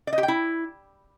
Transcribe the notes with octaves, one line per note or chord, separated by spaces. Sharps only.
D5
D#5
G4
G5
E4